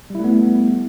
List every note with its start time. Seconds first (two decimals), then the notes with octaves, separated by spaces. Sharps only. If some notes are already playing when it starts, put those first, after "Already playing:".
0.10 G3
0.15 E4
0.20 A3
0.24 B3